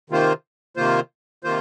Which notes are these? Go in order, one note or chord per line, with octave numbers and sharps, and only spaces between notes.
C3 D#3 A#3 F4 C5
C3 D#3 A#3 F4 C5
C3 D#3 A#3 F4 C5